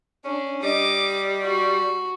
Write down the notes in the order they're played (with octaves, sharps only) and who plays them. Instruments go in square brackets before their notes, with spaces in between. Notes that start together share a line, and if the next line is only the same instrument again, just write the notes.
[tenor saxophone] C#4 [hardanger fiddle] D4
[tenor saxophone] G3 [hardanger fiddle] D#5 D6
[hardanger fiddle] F#4